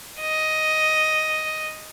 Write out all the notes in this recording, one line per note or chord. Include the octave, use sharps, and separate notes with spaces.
D#5